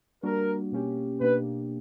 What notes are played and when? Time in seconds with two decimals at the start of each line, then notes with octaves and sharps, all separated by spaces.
0.23 G3 A#3 D4 F#4 A#4
0.72 B2 A#3 C#4 G4
1.20 B2 A#3 D4 G4 B4